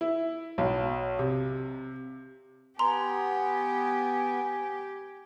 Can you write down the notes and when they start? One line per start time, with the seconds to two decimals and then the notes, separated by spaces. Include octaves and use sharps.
0.01 E4
0.58 B1
1.19 C3
2.79 B3 G4 G#5 A#5 C6